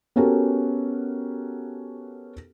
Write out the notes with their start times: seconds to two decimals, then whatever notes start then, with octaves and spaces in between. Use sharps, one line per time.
0.16 B3 C#4 F#4 G4 A4 A#4